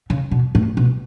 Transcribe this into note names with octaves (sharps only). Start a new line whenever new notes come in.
C#3
B2
A2
B2